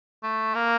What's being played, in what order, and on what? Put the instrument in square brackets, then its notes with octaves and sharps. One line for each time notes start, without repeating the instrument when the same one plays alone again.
[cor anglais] A3
A#3